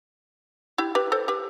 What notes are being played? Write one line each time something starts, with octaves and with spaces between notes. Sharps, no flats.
E4 G4
G4 B4
A4 C5
G4 B4